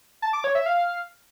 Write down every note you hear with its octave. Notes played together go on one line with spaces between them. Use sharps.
A5
D6
C#5
E5
F5